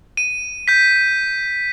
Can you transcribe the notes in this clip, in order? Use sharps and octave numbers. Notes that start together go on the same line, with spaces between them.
D#7
G6 B6